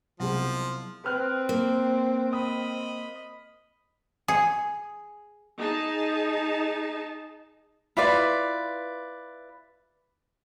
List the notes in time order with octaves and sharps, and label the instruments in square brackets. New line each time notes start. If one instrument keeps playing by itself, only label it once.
[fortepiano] C2 B2 G#3 [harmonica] F3 [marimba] F#3
[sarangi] C4 [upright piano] B4 F6 F#6
[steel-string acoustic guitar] A#3
[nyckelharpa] D#5 B5 [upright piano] D#6
[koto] G#4
[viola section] D#4 G#4 A5
[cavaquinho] E4 F4 B4 D5